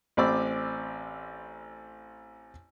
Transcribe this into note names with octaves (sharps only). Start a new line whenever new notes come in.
A1 C4 D5 B5 D6 E6